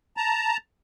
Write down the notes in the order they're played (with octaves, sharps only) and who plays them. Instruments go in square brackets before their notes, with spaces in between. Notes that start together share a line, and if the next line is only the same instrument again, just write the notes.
[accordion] A5 A#5